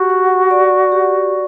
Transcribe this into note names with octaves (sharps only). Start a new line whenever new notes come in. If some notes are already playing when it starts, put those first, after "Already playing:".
Already playing: F#4 G4
F#5
D5
G4